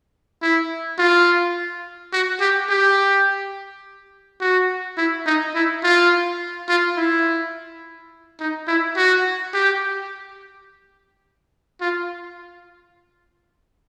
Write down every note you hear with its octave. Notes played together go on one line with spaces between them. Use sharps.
E4
F4
F#4
G4
G4
F#4
E4
D#4
E4
F4
F4
E4
D#4
E4
F#4
G4
F4